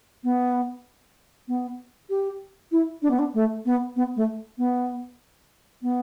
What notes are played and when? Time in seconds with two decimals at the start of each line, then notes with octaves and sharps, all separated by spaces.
0.24 B3
1.48 B3
2.10 G4
2.72 E4
3.02 D4
3.11 B3
3.19 D4
3.34 A3
3.65 B3
3.96 B3
4.16 A3
4.58 B3
5.82 B3